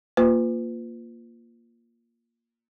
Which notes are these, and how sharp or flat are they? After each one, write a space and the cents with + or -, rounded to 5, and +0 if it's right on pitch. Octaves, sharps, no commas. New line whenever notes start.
A#3 +0 F4 +0 B4 +35